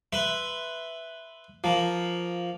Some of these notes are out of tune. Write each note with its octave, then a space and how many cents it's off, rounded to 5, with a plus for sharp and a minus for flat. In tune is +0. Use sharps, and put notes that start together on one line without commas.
B4 +0 E5 +0 C6 -10
F3 +0 A#3 +0